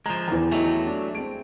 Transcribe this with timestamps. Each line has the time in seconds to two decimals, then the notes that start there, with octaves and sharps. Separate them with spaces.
0.06 F3 G#3 A#5
0.28 E2 D#3 A#5
0.52 F#3 A3 D#4 E4 G4
0.87 D4
1.15 G#3 C4 D7